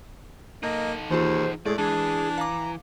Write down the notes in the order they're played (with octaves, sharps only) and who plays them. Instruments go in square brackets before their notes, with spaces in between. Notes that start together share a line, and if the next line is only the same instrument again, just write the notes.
[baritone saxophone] A#3 [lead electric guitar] D#4 A4 [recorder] D#5
[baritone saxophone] D#2 [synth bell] E3 F4 G#4 [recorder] C5
[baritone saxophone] A2 [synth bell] G#3 [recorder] G#4 [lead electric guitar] D5
[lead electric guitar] E3 [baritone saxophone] D4 [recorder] G#4
[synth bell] F5 D6 [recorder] A#5